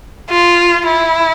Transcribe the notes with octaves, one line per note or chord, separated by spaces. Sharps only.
F4
E4